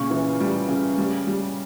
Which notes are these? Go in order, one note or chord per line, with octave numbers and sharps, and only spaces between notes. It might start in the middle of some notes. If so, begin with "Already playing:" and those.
Already playing: A#2 C#3 C#6
E3
G3
C#3
G3
G3